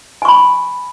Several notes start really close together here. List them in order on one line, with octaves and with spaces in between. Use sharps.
G#5 C#6 B5